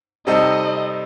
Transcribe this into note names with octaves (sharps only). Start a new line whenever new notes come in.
C3 G3 C4 D#4 A4 D#5